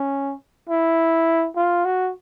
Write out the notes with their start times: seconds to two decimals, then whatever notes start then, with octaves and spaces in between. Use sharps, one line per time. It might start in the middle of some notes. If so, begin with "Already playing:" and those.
Already playing: C#4
0.69 E4
1.56 F4
1.85 F#4